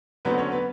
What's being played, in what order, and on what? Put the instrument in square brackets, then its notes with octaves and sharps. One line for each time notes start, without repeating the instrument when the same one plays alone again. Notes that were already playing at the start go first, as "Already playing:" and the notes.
[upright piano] D3 F#3 A3 B3 C4 B4
C#4 C#5
B3 B4